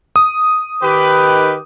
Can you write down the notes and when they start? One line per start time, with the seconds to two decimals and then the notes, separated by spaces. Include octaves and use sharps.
0.16 D#6
0.82 D#3 G4 B4